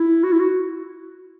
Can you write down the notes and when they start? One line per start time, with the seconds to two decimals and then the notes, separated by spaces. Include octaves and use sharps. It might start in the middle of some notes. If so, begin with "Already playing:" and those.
Already playing: E4
0.23 F#4
0.32 E4
0.40 F#4